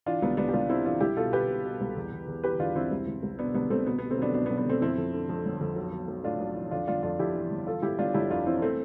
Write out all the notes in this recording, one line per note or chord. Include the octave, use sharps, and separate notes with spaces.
E3 D4 F4
C2 B3
C2 B3 D4
G4
C2 D4 F4
C3 C4 E4
E3 D4 F4
C2 E4 G4
B2 F4 A4
B2 G4 B4
B2
B2
C2
E2
E2
E2
E3 G4 B4
E2 D4 F4
E2 C4 E4
C2
C2
C2
B2 B3 D4
C2 B3 D4
C2 A3 C4
B2 B3
B3
B2
A3 C4
B1 B3 D4
B2 B3 D4
B3
B1
B3
B1 A3 C4
F2 C4 E4
F2
D3
F2
G1
F2
B1
B1
B1
A2 D4 F4
B1
E3
F2 D4 F4
G1 D4 F4
F2 D4 F4
F2 E4 G4
E3
G1
E3 F4 A4
G1 E4 G4
G1 D4 F4
G1 E4 G4
F2 D4 F4
E3 C4 E4
A3 C4